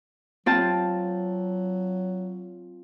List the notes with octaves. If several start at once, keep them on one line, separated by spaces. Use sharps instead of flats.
F#3 C4 F4 A5